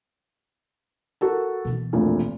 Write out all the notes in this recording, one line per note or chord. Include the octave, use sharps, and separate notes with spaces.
F#4 A4 A#4
B2 E3
F1 D2 A#2